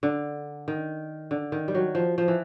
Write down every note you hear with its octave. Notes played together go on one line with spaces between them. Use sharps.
D3
D#3
D3
D#3
G3
F#3
F3
F3
E3